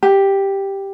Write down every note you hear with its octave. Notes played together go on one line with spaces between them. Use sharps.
G4